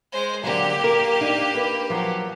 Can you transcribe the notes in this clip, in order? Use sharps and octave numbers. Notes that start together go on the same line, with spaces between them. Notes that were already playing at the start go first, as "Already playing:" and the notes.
G#3 C5
D3 F#3 A#3 G4
A#4
D4 D#4
B4
F3 F#3